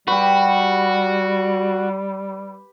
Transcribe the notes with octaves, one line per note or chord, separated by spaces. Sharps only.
G3 F#4 G4 B4